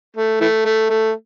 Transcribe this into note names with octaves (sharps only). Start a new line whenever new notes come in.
A3
E3 A3
A3
A3